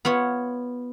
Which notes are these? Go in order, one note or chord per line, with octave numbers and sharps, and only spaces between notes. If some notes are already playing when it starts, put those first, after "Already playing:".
B3 F4 C#5